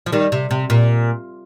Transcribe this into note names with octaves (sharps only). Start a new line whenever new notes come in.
F3
D#3 G3
C3
C3
A#2